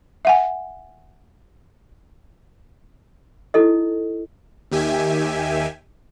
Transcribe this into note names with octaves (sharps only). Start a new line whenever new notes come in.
E5 F#5 G#5
D#4 E4 A4 D#5
D#2 D#3 G4 E5 G#5